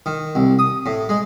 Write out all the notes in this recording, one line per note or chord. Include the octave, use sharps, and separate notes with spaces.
D#3
C2
D#6
A2
G#3